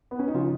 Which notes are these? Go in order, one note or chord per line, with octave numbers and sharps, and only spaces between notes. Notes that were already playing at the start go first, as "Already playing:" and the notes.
B3
C#4
D#4
C#3 F3 C#4 F4